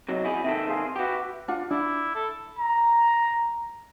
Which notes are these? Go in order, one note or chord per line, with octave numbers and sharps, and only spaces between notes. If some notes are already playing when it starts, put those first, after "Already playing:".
C3 F#3 D#5
E4 G#4
C3 D#3 A4 E5 G5
G#4 C5 F5
F#4 G4 B4 E5
D4 F4 F#5
D4 E4 D5
A4
A#5